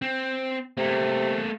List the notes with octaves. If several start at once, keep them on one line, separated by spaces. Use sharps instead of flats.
C4
C3 A3 A#3